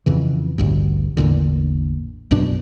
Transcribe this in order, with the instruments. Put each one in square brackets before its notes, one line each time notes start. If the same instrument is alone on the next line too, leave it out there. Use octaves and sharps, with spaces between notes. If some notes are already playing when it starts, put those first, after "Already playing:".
[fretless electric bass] F2 C#3 E3
A1 D2 G2
A1 E2 A#2 D3
A#1 F#2 B2 D4